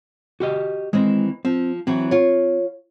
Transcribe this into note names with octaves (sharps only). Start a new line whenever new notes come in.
F#4 G4 D#5
D#3 E3 G#3 C4
F3 C4
E3 F#3 C4
F4 C#5